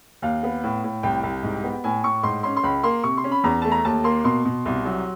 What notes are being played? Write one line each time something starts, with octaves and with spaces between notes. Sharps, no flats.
D#2 F5
B3
A2
A2
C2 G5
C2
G#2
B3
A2 G#5
A2 C#6
G#2 C6
C#4 C6
C6
C#2 B5
A#3 C6
C3 C#6
C6
C#4
B5
E2 A#5
A3 A5
A#5
D#2 A5
A#3 C6
B2 C6
B2
C2
F#3